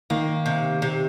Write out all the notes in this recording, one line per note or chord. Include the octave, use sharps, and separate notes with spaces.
D#3 A#3
C3
C3